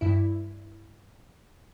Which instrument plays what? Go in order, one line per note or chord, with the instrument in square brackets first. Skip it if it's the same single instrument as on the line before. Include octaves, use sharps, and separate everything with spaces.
[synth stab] G2 E4